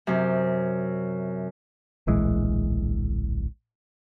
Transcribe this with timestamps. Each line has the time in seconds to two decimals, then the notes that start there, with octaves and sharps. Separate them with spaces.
0.07 F#2 C3
2.07 D1 A#1 E3 G#3